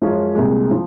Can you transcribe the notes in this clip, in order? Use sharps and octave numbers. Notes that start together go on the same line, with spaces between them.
F#2 F3 G#3 C#4 F4
C2 A#2 G#3
F3